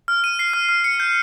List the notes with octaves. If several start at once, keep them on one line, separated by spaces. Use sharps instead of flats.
F6
D#7
C7
F6
F6
C#7
G6